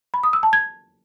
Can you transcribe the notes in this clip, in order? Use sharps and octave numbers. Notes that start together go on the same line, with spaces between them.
B5
D#6
E6
A5
G#6